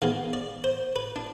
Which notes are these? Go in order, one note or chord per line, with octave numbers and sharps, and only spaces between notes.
D#3 G#3 B3 F5
D5
C5
B4
D4